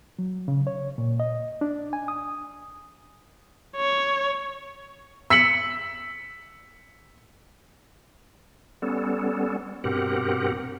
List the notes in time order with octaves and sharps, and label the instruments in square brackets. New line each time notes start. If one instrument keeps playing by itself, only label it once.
[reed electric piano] F#3
C#3
C#5
A#2
D#5
D4
G#5
D#6
[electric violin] C#5
[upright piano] E6 B6 C#7 F#7
[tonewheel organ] G3 B3 C#4 A4
G2 B2 C4 G4 A#4 F#5